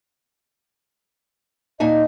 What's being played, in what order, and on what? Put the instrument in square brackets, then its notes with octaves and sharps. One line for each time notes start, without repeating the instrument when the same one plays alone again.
[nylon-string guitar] A#2 D#4 G#5 [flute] D#5